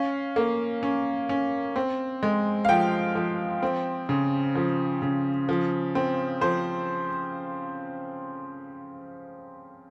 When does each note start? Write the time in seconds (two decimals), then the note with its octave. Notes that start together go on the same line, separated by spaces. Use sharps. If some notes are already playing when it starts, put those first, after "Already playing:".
Already playing: C#4 F5
0.36 A#3
0.83 C#4
1.29 C#4
1.76 C4
2.23 G#3
2.65 F5
2.69 F3 G5
3.15 F3
3.62 C4
4.09 C#3
4.55 F3
5.02 C#3
5.49 F3
5.95 C4
6.41 F3 C5